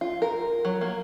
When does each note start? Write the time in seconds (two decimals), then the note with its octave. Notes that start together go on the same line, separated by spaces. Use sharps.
0.01 F4
0.22 A#4
0.65 F#3
0.81 A#3